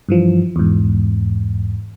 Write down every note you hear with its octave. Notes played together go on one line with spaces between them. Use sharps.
G2 E3 F3
E2 G#2